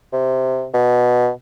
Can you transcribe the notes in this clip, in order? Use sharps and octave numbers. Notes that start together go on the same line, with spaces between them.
C3
B2